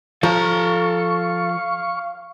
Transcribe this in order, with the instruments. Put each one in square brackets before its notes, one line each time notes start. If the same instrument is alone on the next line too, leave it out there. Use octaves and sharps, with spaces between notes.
[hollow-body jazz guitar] F3 [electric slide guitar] A4 A#5 [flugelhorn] F5 [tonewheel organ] C#6